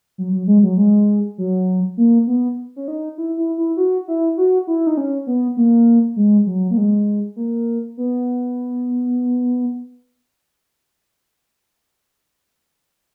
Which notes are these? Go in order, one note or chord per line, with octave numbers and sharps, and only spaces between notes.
F#3
F#3
G#3
F#3
G#3
F#3
A#3
B3
C#4
D#4
E4
E4
E4
F#4
E4
F#4
E4
D#4
C#4
B3
A#3
G#3
F#3
A#3
G#3
A#3
B3